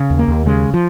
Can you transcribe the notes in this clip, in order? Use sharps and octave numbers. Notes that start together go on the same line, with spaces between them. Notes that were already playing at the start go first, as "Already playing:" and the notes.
Already playing: C#3
D#2
A#3
D#2
C#3 G#3
F3